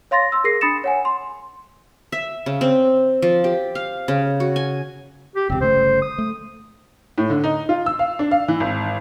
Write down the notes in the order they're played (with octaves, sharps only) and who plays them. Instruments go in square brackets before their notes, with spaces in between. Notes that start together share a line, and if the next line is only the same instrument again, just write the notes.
[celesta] C#5 F5 C6 A6 A#6
C6 E6
G#4 A#4 A#6 C7
D4 B5 D#6 A6 C#7 E7
C#5 F#5 G#5
C6
[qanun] E5
C#3
C4
F3
G4
F5
C#3
F#4
G#5
[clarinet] G4
[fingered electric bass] E1 C#2 [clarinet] C4
[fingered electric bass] G1 C#3 A3 [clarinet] C5
[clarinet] D#6
[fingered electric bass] A3
[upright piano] A2
D3
D#4
F4
E6
F5
D4
F5
E3
G#1